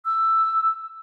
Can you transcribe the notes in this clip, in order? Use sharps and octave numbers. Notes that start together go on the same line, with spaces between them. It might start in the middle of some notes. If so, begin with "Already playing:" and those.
E6